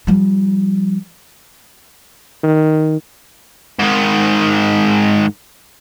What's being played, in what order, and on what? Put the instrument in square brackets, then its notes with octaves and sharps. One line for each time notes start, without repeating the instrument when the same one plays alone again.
[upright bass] F3 G3
[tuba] D#3
[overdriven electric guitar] G#2 D#3